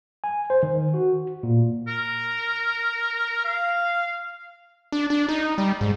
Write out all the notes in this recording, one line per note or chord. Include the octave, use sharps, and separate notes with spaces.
G#5
C5
D#3
F#4
A#2
A#4
F5
D4
D4
D#4
G3
G#2